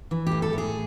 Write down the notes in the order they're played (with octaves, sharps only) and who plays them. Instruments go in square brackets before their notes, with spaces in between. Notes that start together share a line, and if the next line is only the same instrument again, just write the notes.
[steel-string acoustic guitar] E3
A2 G4
A4
A2 G#4